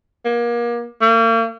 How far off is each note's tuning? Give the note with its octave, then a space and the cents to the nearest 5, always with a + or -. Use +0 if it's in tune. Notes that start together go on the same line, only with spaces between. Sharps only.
A#3 +30
A#3 -40